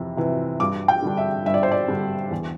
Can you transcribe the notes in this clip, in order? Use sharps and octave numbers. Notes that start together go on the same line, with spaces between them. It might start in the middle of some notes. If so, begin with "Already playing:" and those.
Already playing: F2 C3 E3
C3 E3
G2 D6
G5
D3 G3 D4
E5
G2 E5
D5
C5
D5
D3 G3 D4
E2